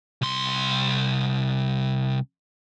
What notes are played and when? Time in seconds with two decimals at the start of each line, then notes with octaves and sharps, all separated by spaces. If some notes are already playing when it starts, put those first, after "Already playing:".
0.22 C2 C6